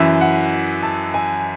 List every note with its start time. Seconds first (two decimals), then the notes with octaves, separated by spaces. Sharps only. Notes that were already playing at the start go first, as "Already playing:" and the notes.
Already playing: F#2 E3 E5
0.21 F#5
0.83 A5
1.14 G#5